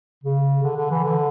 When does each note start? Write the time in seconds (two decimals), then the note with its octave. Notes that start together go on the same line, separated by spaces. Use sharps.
0.23 C#3
0.63 D3
0.76 D3
0.91 E3
1.04 D3